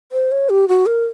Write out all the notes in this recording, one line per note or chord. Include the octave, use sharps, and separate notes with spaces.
C5
C#5
G4
F#4
A#4